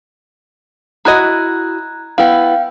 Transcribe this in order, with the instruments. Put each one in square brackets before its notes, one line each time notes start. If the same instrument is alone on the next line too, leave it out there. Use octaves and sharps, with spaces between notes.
[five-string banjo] E4 F#4 D#5 [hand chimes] A#5 F#6 G#6
[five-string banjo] B3 E4 [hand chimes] F5 G5